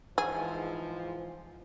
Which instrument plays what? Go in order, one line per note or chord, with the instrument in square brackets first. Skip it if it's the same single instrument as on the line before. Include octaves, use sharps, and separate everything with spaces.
[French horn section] G#2 E3 F3 [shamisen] G#4